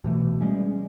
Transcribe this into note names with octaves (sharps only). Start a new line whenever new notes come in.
B2 E3 A3
G3 G#3 C#4